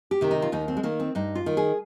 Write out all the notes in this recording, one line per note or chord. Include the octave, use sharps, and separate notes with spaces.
G4
C3 D#3
D#4
F4
D#2 D#4
C4
G#3
D#3 A#3
C4
G2 D#4
F4
D#3
G#4